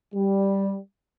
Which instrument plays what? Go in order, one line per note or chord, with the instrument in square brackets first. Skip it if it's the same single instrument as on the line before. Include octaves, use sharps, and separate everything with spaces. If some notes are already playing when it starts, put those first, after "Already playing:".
[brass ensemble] G3